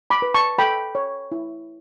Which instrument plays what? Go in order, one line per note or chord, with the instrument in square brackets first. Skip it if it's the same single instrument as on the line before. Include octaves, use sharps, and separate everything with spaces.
[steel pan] B5 D6
B4
A5 C#6
A4 G5 B5
C#5
E4